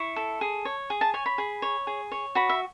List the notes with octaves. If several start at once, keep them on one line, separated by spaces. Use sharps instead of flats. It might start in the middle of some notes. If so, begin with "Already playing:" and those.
Already playing: E4 C#6
A4
G#4
C#5
G#4
A5
C#5 G#5
B5
G#4
C#5
G#4
C#5
F#4 B5
E5